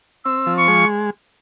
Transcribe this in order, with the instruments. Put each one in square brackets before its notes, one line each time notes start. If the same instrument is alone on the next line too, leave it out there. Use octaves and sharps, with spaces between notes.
[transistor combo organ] C4 [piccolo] E6
[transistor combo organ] F3
[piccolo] C#6
[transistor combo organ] G#3